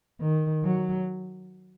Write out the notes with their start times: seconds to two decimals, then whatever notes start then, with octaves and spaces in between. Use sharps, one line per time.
0.21 D#3
0.64 F#3